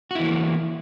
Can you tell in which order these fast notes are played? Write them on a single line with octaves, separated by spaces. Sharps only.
F#4 E4 E3 A#3